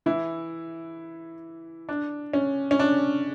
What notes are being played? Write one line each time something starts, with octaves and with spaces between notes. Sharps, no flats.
E3 E4
D4
C#4
C#4
D4